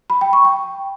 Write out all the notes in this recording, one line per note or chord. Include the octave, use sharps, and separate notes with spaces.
B5
G5
C#6
G5